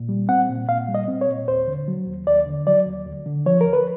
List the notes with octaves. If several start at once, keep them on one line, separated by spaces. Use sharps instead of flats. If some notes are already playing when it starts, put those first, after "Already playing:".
Already playing: A#2
G3
C4 F#5
A#2
A#2 F5
G3
D#5
C4
C#5
A#2
D#2 C5
D3
F#3
D#2
D#2 D5
D3
F#3 D5
D#2
D2
D3
F3 C#5
A#4
D2
B4